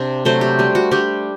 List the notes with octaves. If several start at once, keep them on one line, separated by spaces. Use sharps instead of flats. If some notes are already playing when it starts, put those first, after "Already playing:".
Already playing: C3 C4 D4
C3 F#3 A3 D4 C5
G4
G3 D4
F#4
G3 D4 G4